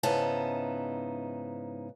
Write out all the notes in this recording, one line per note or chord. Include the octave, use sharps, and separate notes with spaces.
G#2 C#3 B3 D#4 E4 A5